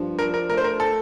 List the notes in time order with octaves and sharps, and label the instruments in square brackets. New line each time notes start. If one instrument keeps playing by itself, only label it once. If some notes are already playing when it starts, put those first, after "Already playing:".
Already playing: [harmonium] G2 F3
[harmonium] D4 [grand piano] A#4
[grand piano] A#4
[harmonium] A3 [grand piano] A#4
[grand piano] C5
A#4
A4